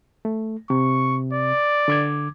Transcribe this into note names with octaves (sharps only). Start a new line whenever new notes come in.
A3
C3 C#6
D5
D3 D6 G#6